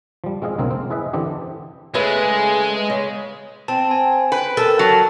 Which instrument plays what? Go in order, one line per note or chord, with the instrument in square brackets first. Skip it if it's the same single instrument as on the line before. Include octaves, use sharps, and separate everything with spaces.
[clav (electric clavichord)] F3 G3
G#3 C4 F4 G#4 D#5
B1 C#3 A#3 C4 F5
C4
E4 G#4 B4 D#5 E5
D3 E3 C4 D4 G4
[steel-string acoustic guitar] C#3 A3 B4 [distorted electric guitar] G#3
[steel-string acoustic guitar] C#3
[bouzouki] C4 [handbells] A5
[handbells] G#5
[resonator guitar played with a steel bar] B4 [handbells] G5
[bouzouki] A4 [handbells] A#4 A5
[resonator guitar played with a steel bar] F#3